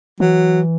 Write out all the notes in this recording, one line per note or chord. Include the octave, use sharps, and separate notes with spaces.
E3 F#3